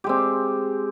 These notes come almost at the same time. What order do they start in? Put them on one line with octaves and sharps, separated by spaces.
G4 G#3 C4